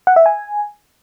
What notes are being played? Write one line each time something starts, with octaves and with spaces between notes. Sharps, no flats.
F#5
E5
G#5